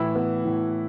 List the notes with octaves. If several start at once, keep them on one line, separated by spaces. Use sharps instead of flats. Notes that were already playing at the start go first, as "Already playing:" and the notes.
Already playing: A2 E3 E4
B3
A2